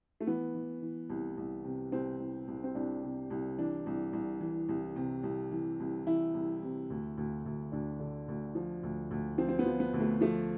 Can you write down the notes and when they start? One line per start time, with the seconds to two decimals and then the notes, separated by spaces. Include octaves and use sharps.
0.20 A3
0.27 E3 B3
0.55 E3
0.82 E3
1.10 C2
1.37 C2
1.64 C3
1.92 C2 C4
2.20 C2
2.48 C2
2.64 C4
2.75 C2 D4
3.03 C3
3.30 C2
3.58 E3 D4
3.86 C2
4.13 C2
4.41 E3
4.69 C2
4.96 C3
5.23 C2
5.51 E3
5.80 C2
6.06 E3 E4
6.34 C2
6.63 C3
6.90 D2
7.17 D2
7.46 D2
7.72 D2 D4
8.00 D3
8.28 D2
8.55 F3
8.83 D2
9.11 D2
9.38 F3 C4
9.49 C4
9.59 B3
9.66 F3
9.80 B3
9.94 D2
10.00 A3
10.21 F3 A3